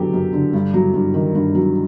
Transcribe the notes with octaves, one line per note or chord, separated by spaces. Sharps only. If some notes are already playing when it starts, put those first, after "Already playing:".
Already playing: F#2 D3 F#3 B3 G4 A4
F#2
D3
G2
F#3
G2
D#3
G2
F#3